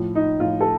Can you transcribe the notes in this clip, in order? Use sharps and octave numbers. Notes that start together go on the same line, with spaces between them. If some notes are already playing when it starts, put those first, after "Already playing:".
Already playing: A2 F3
D#4
A2 F3 F4
A4